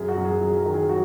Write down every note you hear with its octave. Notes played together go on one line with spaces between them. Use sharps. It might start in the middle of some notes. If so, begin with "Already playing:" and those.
Already playing: F#2 G#4
F#4
F#2
G#4
F#3 G#4
A#4
D#3
G#4
F#3 F#4